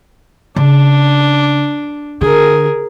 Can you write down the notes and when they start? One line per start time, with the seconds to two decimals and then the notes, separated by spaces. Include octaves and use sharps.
0.56 C#3 D4
2.21 D3 G#4 A#4